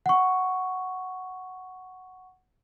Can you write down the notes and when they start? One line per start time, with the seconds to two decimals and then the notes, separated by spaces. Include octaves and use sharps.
0.06 F#5 C#6